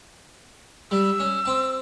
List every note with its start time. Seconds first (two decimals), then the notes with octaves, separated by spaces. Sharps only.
0.91 G3 E6
1.20 C#4
1.45 C4 A5